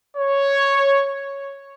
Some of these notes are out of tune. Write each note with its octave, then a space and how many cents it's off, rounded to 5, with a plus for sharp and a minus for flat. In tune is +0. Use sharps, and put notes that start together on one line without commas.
C#5 +0